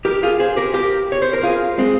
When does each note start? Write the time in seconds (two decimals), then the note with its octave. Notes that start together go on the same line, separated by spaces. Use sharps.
0.05 G4 A#4
0.23 F4 G#4
0.40 G#4 C5
0.57 G4 A#4
0.74 G4 A#4
1.12 C#5
1.22 C5
1.33 A#4
1.43 F4 G#4
1.78 G#3 C4